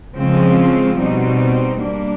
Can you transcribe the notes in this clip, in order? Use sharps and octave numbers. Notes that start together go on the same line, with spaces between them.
C#3 F3 G#3 C4 F4
B2 G3 C4 D#4
G3 A#3 D4